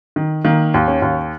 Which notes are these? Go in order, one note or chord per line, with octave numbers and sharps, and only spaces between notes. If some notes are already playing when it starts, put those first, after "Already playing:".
D#3
D#3 A#3
D#2
C#4
D#2